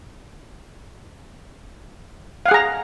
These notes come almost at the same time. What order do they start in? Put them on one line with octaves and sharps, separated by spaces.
F5 F#5 G#4 A#5